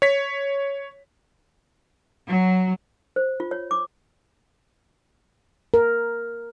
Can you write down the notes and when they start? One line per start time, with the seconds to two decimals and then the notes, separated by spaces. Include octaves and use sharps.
0.02 C#5 B6
2.29 F#3
3.16 C5
3.40 F4
3.51 C#5
3.71 D6
5.74 A#4